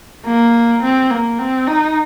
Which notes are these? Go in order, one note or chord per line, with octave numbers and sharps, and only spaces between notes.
A#3
C4
A#3
C4
D#4